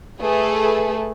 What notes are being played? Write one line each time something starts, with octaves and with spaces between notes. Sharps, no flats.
A3 G#4 B4